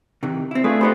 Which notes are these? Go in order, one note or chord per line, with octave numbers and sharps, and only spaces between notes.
C3 D#3 E3
C4 E4
A3 D4 F4 G#4 B4
B3 D#4 G4 C5